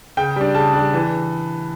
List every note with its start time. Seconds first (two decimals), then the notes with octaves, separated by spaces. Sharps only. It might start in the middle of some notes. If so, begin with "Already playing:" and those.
0.17 C#3 G5
0.36 G3 D4
0.55 C#3 A5
0.74 G3 D4
0.94 E3